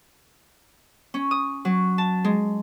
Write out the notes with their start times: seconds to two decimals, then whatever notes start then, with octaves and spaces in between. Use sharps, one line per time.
1.14 C#4
1.31 D#6
1.65 F#3
1.98 A5
2.24 G#3